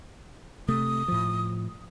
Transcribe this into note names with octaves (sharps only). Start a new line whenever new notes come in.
C3 A3 D#6
A2 F3